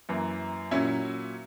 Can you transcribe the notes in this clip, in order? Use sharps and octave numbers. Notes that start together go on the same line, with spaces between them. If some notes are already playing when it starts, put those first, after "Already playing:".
F#2 E3 A#3
A#2 F#3 C#4 E4